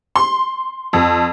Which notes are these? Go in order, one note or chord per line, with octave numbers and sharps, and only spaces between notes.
C6
F2